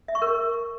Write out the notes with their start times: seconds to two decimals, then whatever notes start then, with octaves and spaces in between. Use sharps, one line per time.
0.08 E5
0.15 C#6
0.22 A#4